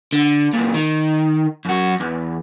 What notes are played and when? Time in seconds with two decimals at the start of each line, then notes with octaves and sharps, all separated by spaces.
0.13 D3
0.54 C#2 A#2
0.74 D#3
1.66 F#2 F#4
2.00 E2